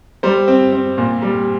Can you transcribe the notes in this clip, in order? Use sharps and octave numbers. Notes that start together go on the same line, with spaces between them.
G3 C5
C4
C4
A#2
G3